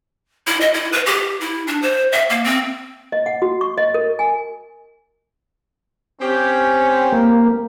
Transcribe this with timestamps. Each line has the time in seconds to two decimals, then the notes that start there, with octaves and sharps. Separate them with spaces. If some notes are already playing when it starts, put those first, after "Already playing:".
0.47 E4
0.61 D#5
0.74 E4
0.92 B4
1.06 G4
1.41 E4
1.67 D4
1.82 C5
2.12 E5
2.30 A#3
2.44 C4
3.12 D#5
3.26 F#5
3.42 F#4
3.61 C#6
3.78 D#5
3.94 A#4
4.19 G#5
6.21 C4 C#4 G4
7.12 A#3